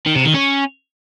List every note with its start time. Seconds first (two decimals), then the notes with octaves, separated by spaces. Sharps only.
0.06 D#3
0.16 C3
0.25 D#3
0.34 C#4